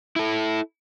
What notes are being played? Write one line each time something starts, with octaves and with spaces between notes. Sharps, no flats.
E4 A4